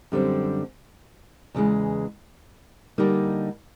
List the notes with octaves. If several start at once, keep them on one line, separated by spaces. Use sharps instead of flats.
F#2 D3 G3 C4
E2 C#3 E3 G#3
D3 G3 A#3 D#4